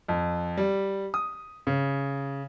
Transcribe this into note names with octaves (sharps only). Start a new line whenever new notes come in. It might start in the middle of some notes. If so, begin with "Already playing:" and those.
F2
G3
D#6
C#3